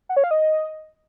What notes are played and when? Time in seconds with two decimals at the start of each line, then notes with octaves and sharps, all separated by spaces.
0.09 F#5
0.16 C#5
0.24 F5
0.31 D#5